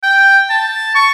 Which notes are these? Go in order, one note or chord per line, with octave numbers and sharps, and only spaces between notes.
G5
A5
C#6